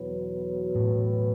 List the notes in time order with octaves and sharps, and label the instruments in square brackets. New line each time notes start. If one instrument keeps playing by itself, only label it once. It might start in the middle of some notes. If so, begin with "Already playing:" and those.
Already playing: [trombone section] E2 B2 F#3 B3
[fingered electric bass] A2